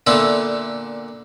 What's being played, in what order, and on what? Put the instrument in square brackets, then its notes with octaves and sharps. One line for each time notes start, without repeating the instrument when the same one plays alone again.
[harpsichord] A#2 D3 B3 E4 F4 A4